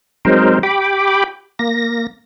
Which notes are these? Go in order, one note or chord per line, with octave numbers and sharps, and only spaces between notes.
F#3 G#3 C4 D#4 A#4 C5
G4 G5 B5 D6
A#3 A#6